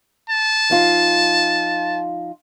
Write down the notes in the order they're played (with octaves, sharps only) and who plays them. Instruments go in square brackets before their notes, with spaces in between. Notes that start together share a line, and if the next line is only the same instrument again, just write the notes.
[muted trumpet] A5
[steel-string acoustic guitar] F3 D#4 F4